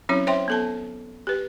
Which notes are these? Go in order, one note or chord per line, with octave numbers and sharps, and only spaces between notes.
F#3 C4 C#4 E4 C#5
C5 C#5 E5 G5 C6
B3 A4 A5
G4 B4